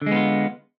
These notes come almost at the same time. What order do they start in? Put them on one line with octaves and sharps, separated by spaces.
D3 G#3 B3 F4